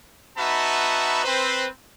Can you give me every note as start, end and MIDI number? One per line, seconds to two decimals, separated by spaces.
0.38 1.24 59
0.38 1.24 63
0.38 1.24 66
0.38 1.24 76
0.38 1.24 81
0.38 1.24 83
1.25 1.67 60
1.25 1.67 71
1.25 1.67 72